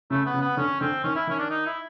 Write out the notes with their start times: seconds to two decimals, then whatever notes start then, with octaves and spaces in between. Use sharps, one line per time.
0.10 C#3 A3
0.26 B3
0.34 C#3
0.41 B3
0.57 D3 C#4
0.81 D3 C4
1.04 D#3 C#4
1.15 E4
1.27 D#3 C#4
1.39 D4
1.50 D#4
1.66 E4